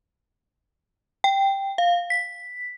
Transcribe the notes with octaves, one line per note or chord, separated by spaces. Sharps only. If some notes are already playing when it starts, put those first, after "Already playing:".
G5
F5
B6